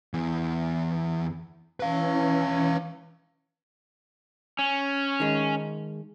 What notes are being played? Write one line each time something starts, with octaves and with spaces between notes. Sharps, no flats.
E2 E3
E3 C#4 B4 F5
C#4
D#3 G#3